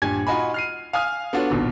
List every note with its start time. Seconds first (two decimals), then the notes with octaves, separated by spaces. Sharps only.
0.02 D#1 G2 G4 G#5 G#6
0.27 D#4 F4 F#4 D#5 G#5 B5
0.54 F6 C7 D#7
0.93 F5 G#5 D#6 F6
1.33 B3 D4 F4 F#4 A4 C#5
1.50 D#1 G#1 B2 D#3